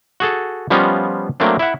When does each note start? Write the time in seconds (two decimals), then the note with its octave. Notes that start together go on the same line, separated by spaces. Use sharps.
0.20 F#4 G#4 A4
0.70 F3 G3 B3 C#4 F4 D#5
1.40 F#3 A3 A#3 C4 D4
1.59 E4 E5 F#5